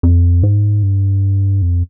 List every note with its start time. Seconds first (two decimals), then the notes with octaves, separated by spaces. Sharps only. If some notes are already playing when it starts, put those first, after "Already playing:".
0.03 F2
0.43 G#2
0.83 G2
1.62 F2